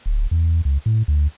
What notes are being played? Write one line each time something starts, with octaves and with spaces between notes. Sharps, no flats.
D1
E2
C#2
A2
D2